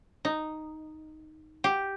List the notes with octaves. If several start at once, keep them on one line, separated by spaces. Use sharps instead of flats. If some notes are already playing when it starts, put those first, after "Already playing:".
D#4
G4